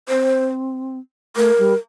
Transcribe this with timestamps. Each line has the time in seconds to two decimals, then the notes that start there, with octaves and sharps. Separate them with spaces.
0.08 C4 C5
1.36 A3 A#4
1.58 G3